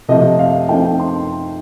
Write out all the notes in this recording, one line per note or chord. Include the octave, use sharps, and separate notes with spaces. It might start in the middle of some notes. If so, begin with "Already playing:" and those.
C3 F3 A3 D#5
F5
F3 A3 C4 D#4 G5
C6